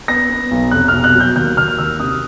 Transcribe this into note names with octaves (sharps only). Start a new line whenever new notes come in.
B3 A#6
B3
B1
F1 F#6
B2 F6
F#6
F#3
G6
D#2 G6
D#2 F6
D#2 E6
C3 D#6